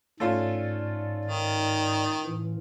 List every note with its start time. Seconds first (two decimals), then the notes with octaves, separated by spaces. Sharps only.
0.20 G#2 A3 C#4 F4 D5
1.25 D#3
2.26 A2 E3